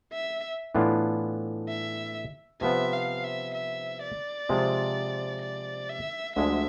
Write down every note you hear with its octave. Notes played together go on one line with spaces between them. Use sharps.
E5
A2 E3 B3 D4 F4
E5
C3 F3 B3 E5
F5
E5
E5
D5
C3 F3 G#3
D5
E5
D2 D3 F3 G#3 E5